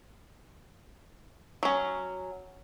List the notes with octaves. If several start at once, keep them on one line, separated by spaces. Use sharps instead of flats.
F#3 C#4